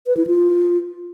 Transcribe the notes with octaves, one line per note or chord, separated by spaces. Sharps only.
B4
E4
F4